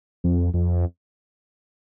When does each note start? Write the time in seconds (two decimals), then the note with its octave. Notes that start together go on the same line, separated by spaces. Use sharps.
0.24 F2
0.54 F2